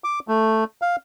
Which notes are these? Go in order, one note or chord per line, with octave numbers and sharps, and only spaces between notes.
D6
A3
F5